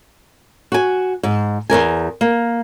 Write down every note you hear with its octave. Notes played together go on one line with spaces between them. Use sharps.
F#4 G#5
G#2
E2 C3 A#4 G#5
A#3